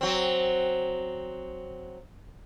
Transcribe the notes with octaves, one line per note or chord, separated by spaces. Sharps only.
F#3 C4